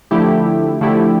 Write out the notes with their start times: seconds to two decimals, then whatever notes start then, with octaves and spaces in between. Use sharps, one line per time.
0.11 D3 F3 A3 E4 G4
0.81 D3 F3 A3 E4 G4